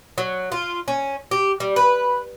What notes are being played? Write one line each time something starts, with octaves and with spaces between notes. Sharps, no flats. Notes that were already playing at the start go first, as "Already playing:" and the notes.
F#3
F4
C#4
G4
G3
B4